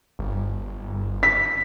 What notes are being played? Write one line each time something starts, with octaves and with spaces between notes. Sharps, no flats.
G1
B6